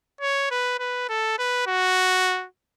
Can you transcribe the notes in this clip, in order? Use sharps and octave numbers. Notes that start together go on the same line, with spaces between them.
C#5
B4
B4
A4
B4
F#4